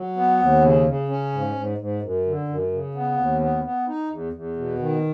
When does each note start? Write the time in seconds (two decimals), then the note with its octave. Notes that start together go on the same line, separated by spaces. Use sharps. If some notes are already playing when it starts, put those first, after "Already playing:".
Already playing: F#3
0.16 B3
0.39 D#2
0.63 C#3
0.86 C#3
1.09 C#4
1.33 G#2
1.56 G#2
1.78 G#2
2.02 F#2
2.25 D3
2.48 F#2
2.72 C#3
2.95 B3
3.17 D#2
3.40 B3
3.63 B3
3.87 D#4
4.09 E2
4.33 E2
4.56 B2
4.79 D#3